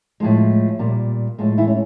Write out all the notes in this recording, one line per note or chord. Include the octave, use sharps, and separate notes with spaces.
A2 F3 G#3
A#2 G3
A2 F3 G#3
E3 E4
C#4